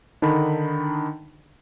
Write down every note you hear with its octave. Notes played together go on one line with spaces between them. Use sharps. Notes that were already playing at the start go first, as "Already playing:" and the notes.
D3 D#3 D4 D#4 B5